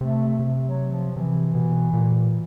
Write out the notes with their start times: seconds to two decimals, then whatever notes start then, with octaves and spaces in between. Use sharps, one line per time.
0.01 C3 A3
0.39 C3
0.65 F#3
0.91 F3
1.16 C3 E3
1.55 B2
1.93 A#2